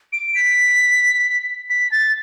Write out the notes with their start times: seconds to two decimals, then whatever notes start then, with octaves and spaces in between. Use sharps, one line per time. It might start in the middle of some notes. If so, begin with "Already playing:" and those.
0.13 D7
0.35 B6
1.70 B6
1.92 A6